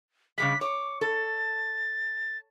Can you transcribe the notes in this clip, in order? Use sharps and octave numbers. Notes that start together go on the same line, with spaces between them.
C#3 G3 G#3 B6
C#5 D6
A4 A6